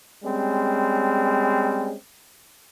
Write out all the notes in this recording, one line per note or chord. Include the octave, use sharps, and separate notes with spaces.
G3 G#3 C4 C#4